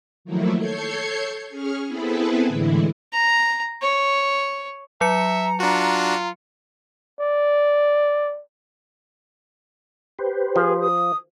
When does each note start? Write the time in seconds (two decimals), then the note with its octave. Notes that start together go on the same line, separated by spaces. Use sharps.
0.25 D#3 F3 F#3 A3 A#3 E4
0.57 A4 C#5 G6 G#6 C7 C#7
1.49 C#4 G#4 C#6 F6
1.87 B3 C4 E4 G#4 A4 B4
2.47 A2 D3 E3 G#3 E4
3.12 A#5
3.82 C#5
5.01 F#3 E5 A#5 C#7
5.60 D4 F4 F#4
7.19 D5
10.19 G4 B4 C5
10.56 F3 G#4
10.80 D#6